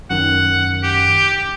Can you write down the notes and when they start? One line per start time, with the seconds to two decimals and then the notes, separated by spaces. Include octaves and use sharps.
0.10 F#2 D#3 F#5
0.83 G4